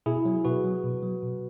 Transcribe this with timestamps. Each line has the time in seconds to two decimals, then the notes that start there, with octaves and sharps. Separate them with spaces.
0.06 B2 E4 G#4
0.25 F#3
0.45 B2 F#4 B4
0.64 F#3
0.84 B2
1.03 F#3
1.23 B2